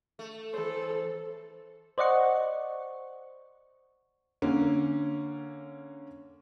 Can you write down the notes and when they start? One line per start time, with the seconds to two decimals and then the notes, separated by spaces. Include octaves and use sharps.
0.19 A3
0.53 E3 A4 C5
1.98 C5 D5 D#5 F#5 C#6
4.42 D3 A#3 C#4